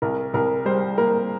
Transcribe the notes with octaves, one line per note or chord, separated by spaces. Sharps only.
C2 A#4
C2 A#4
G3 C5
A#3 A#4